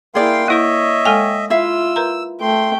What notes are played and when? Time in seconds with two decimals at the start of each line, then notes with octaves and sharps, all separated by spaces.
0.15 A#3 E4 G#4 D5 F5 G5 C6
0.48 A#3 E4 A#4 C#5 D#5 E5
1.05 G#3 A4 G5 G#5
1.50 E4 F4 E5 F5 E6
1.96 A#4 B4 A#5
2.41 A3 G5 C6